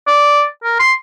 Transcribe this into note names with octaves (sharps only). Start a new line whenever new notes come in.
D5
A#4
C6